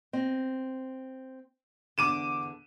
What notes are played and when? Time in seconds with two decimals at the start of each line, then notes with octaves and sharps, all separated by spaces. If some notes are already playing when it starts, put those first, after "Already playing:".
0.13 C4 D#5
1.98 E2 D3 D6 D#7 E7